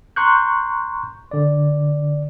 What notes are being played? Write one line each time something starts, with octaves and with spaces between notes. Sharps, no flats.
A#5 C6 C#6 F#6 G6
D3 D5